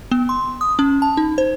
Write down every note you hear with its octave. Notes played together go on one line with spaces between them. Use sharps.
B3
C6
D#6
C#4
A5
D#4
C5